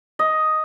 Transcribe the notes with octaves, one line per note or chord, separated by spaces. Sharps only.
D#5